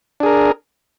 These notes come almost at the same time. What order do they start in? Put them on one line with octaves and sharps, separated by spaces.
D4 G#4 A#4